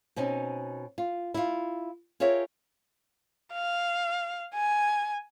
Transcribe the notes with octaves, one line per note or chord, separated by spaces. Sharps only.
B2 C4 C#4 D#4
F4
E4 F4
F4 G#4 A#4 C#5 E5 G5
F5
G#5